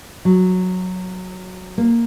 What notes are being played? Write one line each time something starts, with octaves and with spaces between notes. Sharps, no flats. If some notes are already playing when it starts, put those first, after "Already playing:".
F#3
A#3